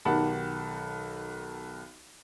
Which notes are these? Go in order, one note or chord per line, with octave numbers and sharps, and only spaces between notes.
B1 D#3 G4 F#5 A5 B5